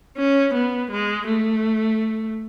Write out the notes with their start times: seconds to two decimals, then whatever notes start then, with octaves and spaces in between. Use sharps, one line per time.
0.17 C#4
0.54 B3
0.91 G#3
1.28 A3